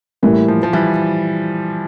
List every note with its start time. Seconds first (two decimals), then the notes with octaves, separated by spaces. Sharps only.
0.22 A2 E3 G3 A#3
0.48 F3
0.63 F3
0.73 E3 G3